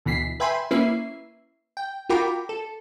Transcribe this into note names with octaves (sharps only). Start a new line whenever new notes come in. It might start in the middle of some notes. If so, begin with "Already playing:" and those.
D2 B2 E3 B6 C7
B4 E5 G5 G#5 B5 C6
A#3 C#4 E4 B4 E5 C7
G5
F4 F#4 A#4 G5 B5 D6
A4